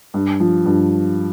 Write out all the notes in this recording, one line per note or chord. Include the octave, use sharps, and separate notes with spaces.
G2
F3
G2